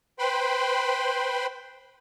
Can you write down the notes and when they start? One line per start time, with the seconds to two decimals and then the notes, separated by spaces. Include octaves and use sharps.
0.19 B4 C5 G5 B5 C6